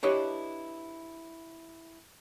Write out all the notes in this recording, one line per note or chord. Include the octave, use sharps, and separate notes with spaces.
D4 E4 G4 B4 C#5 D#5